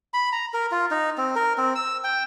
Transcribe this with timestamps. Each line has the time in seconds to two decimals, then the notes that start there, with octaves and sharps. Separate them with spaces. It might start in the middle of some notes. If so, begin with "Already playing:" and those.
0.14 B5
0.32 A#5
0.54 A#4
0.72 F4
0.91 D#4
1.18 C4
1.35 A#4
1.58 C4
1.75 E6
2.04 G5